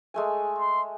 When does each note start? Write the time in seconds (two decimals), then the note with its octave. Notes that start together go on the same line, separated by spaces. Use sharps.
0.14 G#3 A3 G#5
0.59 C6